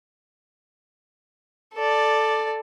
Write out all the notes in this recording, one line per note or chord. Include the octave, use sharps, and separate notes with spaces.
A4 D5